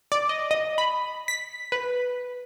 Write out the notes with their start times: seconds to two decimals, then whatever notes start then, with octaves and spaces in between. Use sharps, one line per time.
0.12 D5
0.29 D#5
0.51 D#5
0.78 B5
1.28 B6
1.72 B4